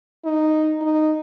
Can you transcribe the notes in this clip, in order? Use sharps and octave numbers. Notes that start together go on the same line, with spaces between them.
D#4
D#4